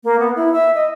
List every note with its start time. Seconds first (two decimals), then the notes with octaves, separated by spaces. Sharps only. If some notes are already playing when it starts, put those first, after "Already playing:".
0.04 A#3
0.19 B3
0.35 E4
0.52 E5
0.74 D#5